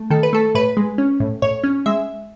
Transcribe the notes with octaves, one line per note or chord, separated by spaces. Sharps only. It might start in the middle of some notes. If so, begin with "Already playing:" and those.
Already playing: A3
D#3 A4
B4
A3 A4
A2 B4
G#3
C#4
A2
A2 C#5
C#4
G#3 E5